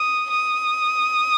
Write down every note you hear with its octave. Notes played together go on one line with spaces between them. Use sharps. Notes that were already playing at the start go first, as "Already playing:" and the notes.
Already playing: D#6
D#6